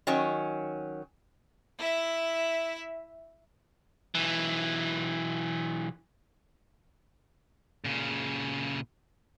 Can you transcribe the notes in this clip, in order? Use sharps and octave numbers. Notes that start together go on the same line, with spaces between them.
D#3 F#3 C#4
E4 E5
B1 E3
A#2 C#3